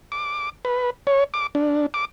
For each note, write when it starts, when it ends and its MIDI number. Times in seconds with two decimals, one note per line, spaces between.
0.12 0.50 86
0.65 0.90 71
1.07 1.24 73
1.34 1.47 86
1.55 1.86 62
1.94 2.05 86